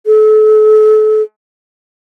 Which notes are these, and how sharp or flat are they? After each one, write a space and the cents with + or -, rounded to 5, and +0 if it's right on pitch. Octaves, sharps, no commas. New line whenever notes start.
A4 -35